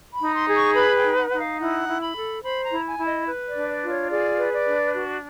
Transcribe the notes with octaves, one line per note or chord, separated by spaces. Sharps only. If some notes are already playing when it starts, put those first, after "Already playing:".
B5
D#4
C6
G#4
C#6
B4 B5
G5
D#4
F#5
D#4 F#5
F5
E4 F#5
E4
B5
A4
C5 B5
A#5
E4
G#5
E4
D#5
B4
D5
D4
D5
F4
C#5
G#4 D5
B4
D5
D4
F#4